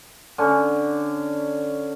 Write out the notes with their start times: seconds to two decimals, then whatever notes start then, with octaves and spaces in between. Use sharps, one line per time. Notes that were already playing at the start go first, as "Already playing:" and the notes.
0.38 D3 C#4